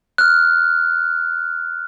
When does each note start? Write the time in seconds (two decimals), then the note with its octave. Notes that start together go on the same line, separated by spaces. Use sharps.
0.18 F6 F#6